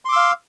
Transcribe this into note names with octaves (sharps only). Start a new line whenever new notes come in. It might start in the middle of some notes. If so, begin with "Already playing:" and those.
F5 C6 D6 E6